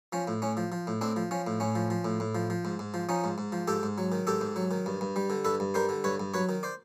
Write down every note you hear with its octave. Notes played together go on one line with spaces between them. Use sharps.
F3 C#4
A2
A2 C#4
F3
F3
A2
A2 C4 D4
F3
F3 C#4
A2
A2 C#4
F3
F3
A2
A2
F3
F3
G#2
G#2
F3
F3 C#4 D#4
G#2
G#2
F3
G#2 G4 A4
G#2
F#3
D#3
G#2 G4 A4
G#2
F#3
D#3
G2
G2
G3
D3
G2 A4 B4
G2
G3 A#4 C5
D3
G2 B4 C#5
G2
F#3 B4 C#5
D#3
C5 D5